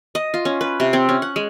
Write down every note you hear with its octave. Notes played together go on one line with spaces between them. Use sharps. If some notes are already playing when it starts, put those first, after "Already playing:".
D#5
F4
C#4
B4
C3
C4
C#4
F#5
G#3